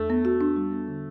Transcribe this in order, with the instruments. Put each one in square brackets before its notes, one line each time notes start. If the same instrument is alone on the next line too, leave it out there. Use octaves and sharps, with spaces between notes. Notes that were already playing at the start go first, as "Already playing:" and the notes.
Already playing: [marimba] E2 [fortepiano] A3
[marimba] B3
F#4
D4
G3
B3
D3